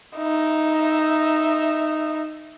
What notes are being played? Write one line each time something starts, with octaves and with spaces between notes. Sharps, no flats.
D#4 E5